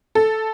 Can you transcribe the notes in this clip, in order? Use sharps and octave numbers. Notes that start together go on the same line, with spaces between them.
A4